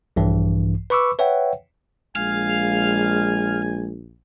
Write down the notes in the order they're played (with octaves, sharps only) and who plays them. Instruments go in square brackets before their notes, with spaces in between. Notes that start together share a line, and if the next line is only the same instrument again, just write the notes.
[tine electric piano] A#1 G2 E3
B4 B5 C#6 D6 E6
B4 C#5 E5 F#5 G5
[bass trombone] A#1 [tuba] G#3 [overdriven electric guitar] F5 [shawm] G#5